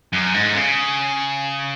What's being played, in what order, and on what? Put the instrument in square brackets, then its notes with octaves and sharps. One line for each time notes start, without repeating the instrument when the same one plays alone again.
[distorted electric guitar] F#2
G#2
C#3